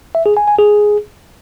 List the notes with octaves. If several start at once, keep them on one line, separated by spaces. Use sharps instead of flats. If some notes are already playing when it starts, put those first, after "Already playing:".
E5
G#4
G#5
G#5
G#4